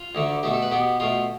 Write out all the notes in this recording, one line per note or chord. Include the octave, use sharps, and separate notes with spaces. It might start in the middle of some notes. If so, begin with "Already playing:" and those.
Already playing: F4
D2 D3 A3
B2 A3 G4
A4
B4
B2 B3 G4
B2 A3 F4